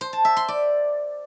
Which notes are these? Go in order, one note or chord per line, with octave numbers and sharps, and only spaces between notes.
C5
A5
E5
C6
D5